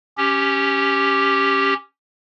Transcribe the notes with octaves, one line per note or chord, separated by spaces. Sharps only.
C#4 G4